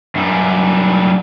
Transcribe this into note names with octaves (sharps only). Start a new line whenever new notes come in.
F#2 G3